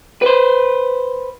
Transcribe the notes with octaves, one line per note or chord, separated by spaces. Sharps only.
B4 C5